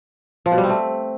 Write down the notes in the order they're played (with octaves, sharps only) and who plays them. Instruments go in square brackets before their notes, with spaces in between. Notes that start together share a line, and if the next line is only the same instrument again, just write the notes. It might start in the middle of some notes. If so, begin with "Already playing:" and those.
[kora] F3
B2
G3
C4
A3